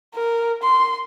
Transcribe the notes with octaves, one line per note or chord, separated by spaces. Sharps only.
A#4
C6